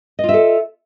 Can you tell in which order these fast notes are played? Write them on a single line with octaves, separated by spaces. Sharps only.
D#5 F4 E5 A4